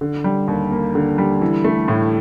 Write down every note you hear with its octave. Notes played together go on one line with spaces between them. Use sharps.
D3
G3
D#2
A#3
D3
G3
E3
A3
A2